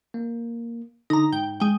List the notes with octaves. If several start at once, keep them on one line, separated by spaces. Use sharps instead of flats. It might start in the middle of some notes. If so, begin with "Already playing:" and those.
A#3
D3 D#4 A#5
G#2 G5
G#3 G5